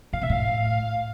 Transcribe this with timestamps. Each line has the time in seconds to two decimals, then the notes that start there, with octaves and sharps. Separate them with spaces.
0.13 A2 F5
0.22 B2 E5
0.30 A2 F5